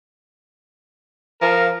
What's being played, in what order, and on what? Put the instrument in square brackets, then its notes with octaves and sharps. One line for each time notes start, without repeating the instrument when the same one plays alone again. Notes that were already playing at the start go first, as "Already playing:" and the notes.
[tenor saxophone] F3 [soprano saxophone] A#4